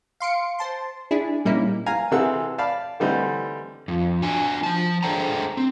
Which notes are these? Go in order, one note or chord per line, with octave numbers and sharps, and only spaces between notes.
F5 C6 C#7 D7
C5 A5 C6
D4 E4 G#4
A#2 G3 A#3 C#4 D#4 E4
F5 G#5 A#5
C3 E3 G#4 A4 F#5 E6
D5 F5 A5 B5
D3 E3 G3 A3 C4 D#4
F2
D4 F#4 G#5
F3 A5
D4 G#4 A4 C5 G5 A#5
C4